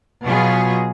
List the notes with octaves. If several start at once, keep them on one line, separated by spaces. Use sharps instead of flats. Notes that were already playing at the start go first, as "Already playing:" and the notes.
B2 F#3 B3 F4 G#4